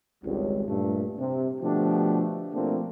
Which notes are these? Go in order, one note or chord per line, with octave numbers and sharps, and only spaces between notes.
G#1 C#2 G3
G2 A#2 A3
C3
B2 D3 F3 A3 D4 G4
B2 F3 A3 A#3 C4 D4